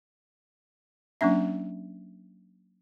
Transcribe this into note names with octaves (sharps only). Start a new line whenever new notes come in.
F#3 A#3 C#4 D4 E5